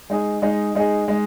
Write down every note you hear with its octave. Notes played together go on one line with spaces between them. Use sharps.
G#3 D#4 G#4
G#3 D#4 G#4
G#3 D#4 G#4
G#3 D#4